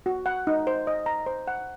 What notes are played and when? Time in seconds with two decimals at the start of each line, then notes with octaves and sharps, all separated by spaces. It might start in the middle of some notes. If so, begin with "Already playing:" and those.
0.06 F#4
0.26 F#5
0.47 D#4
0.67 C5
0.87 D#5
1.06 A#5
1.26 C5
1.48 F#5